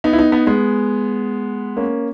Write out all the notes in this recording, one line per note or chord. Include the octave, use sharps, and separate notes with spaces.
B3 D#4
E4
B3 D#4
B3 D#4
G#3 B3
A#3 C#4